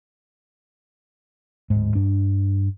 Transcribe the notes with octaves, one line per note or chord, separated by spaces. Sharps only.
D1 G#2
G2 D4